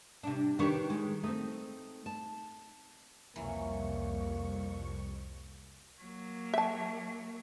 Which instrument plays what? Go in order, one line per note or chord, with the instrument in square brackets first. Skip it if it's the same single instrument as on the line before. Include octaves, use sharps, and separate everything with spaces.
[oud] C3 D4
[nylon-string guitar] D#3 G4 [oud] D4 B4 C#5
[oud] G#3
[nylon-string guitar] A3 C4 [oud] D#4
[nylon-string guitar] A5
[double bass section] C2 [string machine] F2 C#6 [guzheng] E3 F#3 C#4 [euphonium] A#3
[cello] F#3 A#3
[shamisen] E5 A5